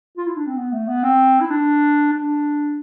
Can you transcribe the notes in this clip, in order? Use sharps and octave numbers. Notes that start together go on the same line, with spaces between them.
F4
E4
D4
C4
B3
A3
B3
C4
E4
D4
D4